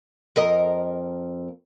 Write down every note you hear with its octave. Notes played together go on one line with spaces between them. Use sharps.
F2 A#4 D#5